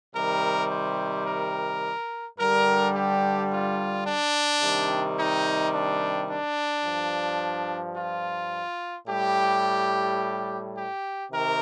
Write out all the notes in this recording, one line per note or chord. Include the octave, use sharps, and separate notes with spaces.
C3 D#3 G3 A#4
C5
A#4
G2 D3 G3 A#4
G4
F4
D4
C3 D#3 G3
D#4
D4
D4
G2 F3
F4
A2 G3 G4
G4
C3 D#3 A#4